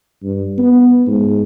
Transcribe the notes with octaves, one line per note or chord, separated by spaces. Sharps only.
G2
B3
G#2